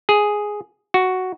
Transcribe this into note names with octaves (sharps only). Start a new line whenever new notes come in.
G#4
F#4